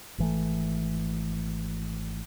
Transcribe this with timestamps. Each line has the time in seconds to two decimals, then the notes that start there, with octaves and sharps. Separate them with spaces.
0.18 G#1 E3 A3